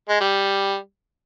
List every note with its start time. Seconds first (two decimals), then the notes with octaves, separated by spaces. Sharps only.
0.09 G#3
0.21 G3